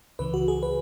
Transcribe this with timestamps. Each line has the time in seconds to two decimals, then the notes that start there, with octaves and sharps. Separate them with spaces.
0.19 C#2 C#3 E3 B4
0.34 F#4
0.48 G#4
0.63 B4